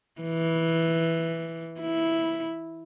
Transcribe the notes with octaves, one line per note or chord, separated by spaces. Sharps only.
E3
E4